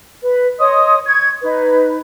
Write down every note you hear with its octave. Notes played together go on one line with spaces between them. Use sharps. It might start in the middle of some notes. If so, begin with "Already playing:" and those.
B4
C#5 D#5 C6 D#6
C#6 G#6
D#4 B4